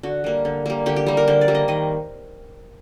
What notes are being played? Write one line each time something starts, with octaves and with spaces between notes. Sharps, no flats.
D3 F#4
G3 A#3
D3
G3 A#3
D3 G4
G4
G3 A#3
A#4
D3 C5
D5
G3 A#3
D#5
D#3 D#5